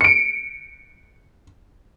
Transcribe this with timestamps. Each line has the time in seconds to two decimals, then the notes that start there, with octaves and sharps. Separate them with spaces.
0.01 C#7 D7